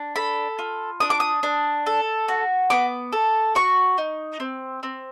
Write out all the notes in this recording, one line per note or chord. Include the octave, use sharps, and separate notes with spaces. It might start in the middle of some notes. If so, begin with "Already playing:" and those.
Already playing: D4
A4 B5
F4
D4 D#6
D6
D#6
D4
A4
F#4
B3 D6
A4
F#4 C#6
D#4
C4
C4